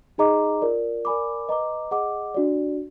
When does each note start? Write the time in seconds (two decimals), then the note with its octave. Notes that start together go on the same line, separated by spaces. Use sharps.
0.18 D#4 G#4 D#5 A#5 D6
0.62 F4 A#4 D5
1.05 A#4 D5 G#5 B5 D6
1.49 B4 D#5 A#5 D6
1.91 G#4 D#5 F#5 D6
2.34 D4 F#4 D5